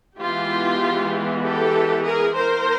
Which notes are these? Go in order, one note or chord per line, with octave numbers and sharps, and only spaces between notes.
E3 G#3 B3 F4 G4
G4 A4
G#4 A#4
A#4 C5